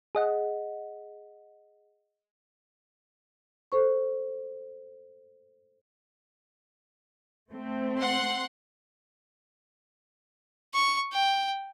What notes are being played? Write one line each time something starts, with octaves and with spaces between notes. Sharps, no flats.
G#4 D#5 F#5
A4 C5 C#6
A3 C4
F#5 C6 F#6
C#6
G5